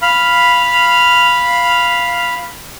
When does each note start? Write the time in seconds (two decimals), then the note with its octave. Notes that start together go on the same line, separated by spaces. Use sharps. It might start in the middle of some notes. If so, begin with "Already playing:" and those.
0.02 F5 B5 F6